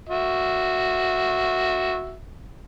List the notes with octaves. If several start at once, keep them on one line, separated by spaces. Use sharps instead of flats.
F#4 E5